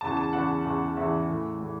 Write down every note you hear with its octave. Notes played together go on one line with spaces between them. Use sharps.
E2 C#3 E3 A5
A5
E2 C#3 E3 F#5
E2 C#3 E3
E2 C#3 E3 E5
A2 E3
A2 E3